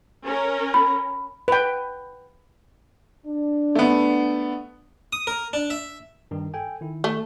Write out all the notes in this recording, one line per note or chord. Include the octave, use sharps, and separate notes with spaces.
C#4 A#4
B5
B4 G5
D4
A3 B3
D#6
A#4
D4
E5
G2 D#3 D#4
A4 G5 G#5
D#3 E4
A3